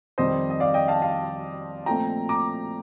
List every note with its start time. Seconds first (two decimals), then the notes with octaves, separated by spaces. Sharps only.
0.18 F2 D#3 G3 C4 C5 D#5
0.50 D#5
0.60 D5 F5
0.74 D#5 G5
0.88 F5 A5
1.02 F5 A5
1.86 A#2 F3 A3 C4 G5 A#5
2.29 A#5 D6